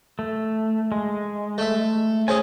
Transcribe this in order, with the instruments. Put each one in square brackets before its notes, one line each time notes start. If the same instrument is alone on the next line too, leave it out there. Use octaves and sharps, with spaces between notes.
[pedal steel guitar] A3
G#3
[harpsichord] A3 E5
[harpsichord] C4 C#4 G#4 [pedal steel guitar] G#5